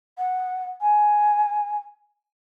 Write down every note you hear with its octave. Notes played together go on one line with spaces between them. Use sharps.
F#5
G#5